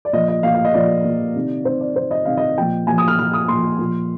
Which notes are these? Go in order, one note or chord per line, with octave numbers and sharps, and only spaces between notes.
D5
A#2 F3 D#5
D#5
A#2 F3 F5
F5
D#5
A#2 F3 D5
A#2 F3
C3 D#3
C3 D#3 C5
D5
C3 D#3 C5
D#5
C3 D#3 F5
D#5
A#2 F3 G5
A#2 F3 G#5
D#6
F6
A#2 F3 F6
D#6
A#2 F3 C6
A#2 F3